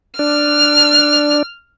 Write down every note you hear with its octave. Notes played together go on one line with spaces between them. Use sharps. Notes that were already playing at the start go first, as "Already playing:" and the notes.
D4 F6